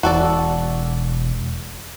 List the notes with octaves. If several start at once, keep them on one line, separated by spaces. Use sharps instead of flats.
E1 F#4 A4 D5